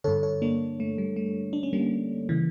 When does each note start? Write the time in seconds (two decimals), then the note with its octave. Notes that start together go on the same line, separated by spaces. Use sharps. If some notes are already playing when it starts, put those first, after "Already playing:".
0.04 G2 D3 A4 C#5
0.23 A4 C#5
0.42 A#3 D4
0.80 A3
0.98 G3
1.16 A3
1.53 D4
1.63 C#4
1.73 G3 A#3
2.29 C#3 E3